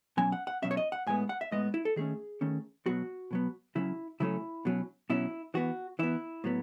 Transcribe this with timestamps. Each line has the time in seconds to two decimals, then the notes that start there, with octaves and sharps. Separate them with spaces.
0.17 B2 F#3 C#4 G#5
0.32 F#5
0.47 F#5
0.62 B2 F#3 C#4 E5
0.71 C#5
0.77 D#5
0.92 F#5
1.07 A2 G#3 B3 G#5
1.29 F#5
1.41 E5
1.52 A2 G#3 B3 D#5
1.74 E4
1.85 A4
1.96 D#3 A3 C#4 G#4
2.41 D#3 A3 C#4
2.86 B2 F#3 B3 F#4
3.31 B2 F#3 B3
3.75 C#3 F#3 A3 C#4 E4
4.20 C#3 F#3 A3 C#4 E4
4.65 B2 F#3 C#4
5.10 B2 F#3 C#4 E4
5.54 E3 B3 F#4
5.99 E3 B3 E4
6.44 A2 F#3 B3